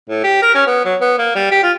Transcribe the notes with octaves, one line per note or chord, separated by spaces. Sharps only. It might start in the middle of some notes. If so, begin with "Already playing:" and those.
A2
G4
A#4
C#4
B3
F#3
B3
A#3
G3
G4
F4